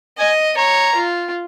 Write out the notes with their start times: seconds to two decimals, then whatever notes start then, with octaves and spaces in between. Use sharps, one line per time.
0.18 D#5 G#5
0.57 C#5 A#5
0.96 F4